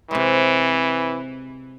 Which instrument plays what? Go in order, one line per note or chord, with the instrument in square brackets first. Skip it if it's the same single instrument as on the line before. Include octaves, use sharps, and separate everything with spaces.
[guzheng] C3 G#3 [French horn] E3